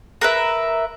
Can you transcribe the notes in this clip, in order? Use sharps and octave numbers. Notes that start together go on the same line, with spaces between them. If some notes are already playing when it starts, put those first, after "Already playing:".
A#4 B4 E5